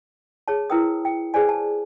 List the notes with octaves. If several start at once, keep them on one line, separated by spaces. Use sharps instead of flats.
G#4 C#5 A5
E4 A#4 B4 G5 D#6
G5
G#4 B4 C5 D5 G#5
A5